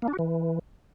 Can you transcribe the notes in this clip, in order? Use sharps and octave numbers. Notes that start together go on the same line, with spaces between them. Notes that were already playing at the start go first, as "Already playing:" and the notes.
A#3
D4
F#4
E3